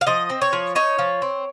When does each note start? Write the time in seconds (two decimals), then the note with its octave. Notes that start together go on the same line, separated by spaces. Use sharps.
0.01 F5
0.07 F3 D#5
0.30 C4
0.42 C#5
0.53 F3
0.75 D#4 C#5
0.99 F3
1.22 C4